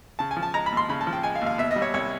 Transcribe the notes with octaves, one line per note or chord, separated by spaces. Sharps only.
C#3 A5
G#5
F3
A5
G#3 A#5
B5
D#2
C6
C#3 B5
A5
F3
G5
G#3 G#5
F5
D#2
F5
B2 E5
D#5
G3
C#5
C2 C#5